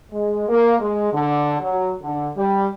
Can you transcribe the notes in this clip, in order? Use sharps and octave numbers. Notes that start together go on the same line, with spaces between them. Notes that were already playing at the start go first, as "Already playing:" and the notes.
G#3
A#3
G#3
D3
F#3
D3
G3